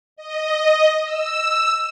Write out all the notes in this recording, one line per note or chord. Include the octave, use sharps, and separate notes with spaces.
D#5
E6